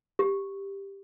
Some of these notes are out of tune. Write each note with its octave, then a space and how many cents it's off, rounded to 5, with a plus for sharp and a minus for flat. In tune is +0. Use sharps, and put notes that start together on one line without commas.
G4 +10